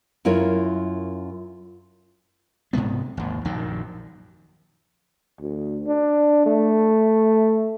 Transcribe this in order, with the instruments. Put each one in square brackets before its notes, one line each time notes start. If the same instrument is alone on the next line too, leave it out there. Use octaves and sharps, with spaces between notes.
[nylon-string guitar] F#2 E4 F4 A#4 C#5
[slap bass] G#2 C3 G#3 B3
G#1 D#2
A#1 F#2 D#3
[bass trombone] D2
D4
A3